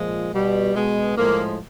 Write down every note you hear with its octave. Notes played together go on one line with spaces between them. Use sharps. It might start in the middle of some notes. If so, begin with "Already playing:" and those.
Already playing: A#2 F3 G#3
B2 G3
B2 G#3
A2 F3 G#3 A#3